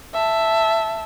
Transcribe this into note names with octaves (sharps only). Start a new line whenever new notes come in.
E5 A5